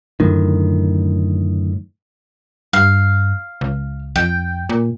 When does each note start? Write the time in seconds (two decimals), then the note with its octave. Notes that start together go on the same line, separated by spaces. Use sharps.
0.20 F#2 A2 D3 D#3
2.73 G2 F5
3.61 C#2
4.16 F2 G5
4.69 A#2